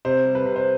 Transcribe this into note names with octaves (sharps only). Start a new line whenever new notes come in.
C3 C5
G3
B4
C3
C5